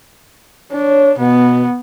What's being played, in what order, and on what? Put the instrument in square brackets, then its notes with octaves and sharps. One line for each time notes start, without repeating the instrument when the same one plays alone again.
[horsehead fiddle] D4 [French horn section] C#5
[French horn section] B2 [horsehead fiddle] B3